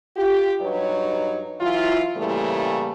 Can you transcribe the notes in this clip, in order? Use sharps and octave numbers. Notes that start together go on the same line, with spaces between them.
F4 G4
G2 F#3 D#4 B4 C#5
E3 F#3 E4 F4
A2 C#3 E3 G3 A3 A#3